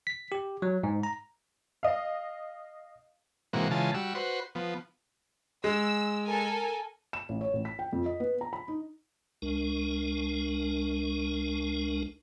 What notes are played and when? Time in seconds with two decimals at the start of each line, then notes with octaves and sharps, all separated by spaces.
0.07 B6
0.32 G4
0.62 F#3
0.83 G#2
1.03 A#5
1.83 D#5 F5
3.53 G#2 C3 E3 A#3 F#4
3.71 C#3 E3 G#3 F4 A5
3.94 G3 F#4 E6
4.15 F#4 B4 C5
4.55 F3 B3
5.64 G#3 E6
6.29 A4 A#4 G#5
7.13 E7
7.29 A1
7.41 C#5
7.53 A1
7.65 B6
7.79 G5
7.93 F2
8.06 D#5
8.20 B3
8.41 A#5
8.53 B5
8.68 D#4
9.42 C#2 G#3 D4 A#4